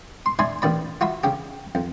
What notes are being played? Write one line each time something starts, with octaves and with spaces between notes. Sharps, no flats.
C6
D#4 D5 E5 G#5 B5 C6
A1 D#3 D5 B5
F4 F#4 E5 B5
C#3 C#4 G4
F2